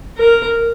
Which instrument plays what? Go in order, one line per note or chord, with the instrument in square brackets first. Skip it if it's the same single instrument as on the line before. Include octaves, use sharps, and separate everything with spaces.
[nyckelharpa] A#4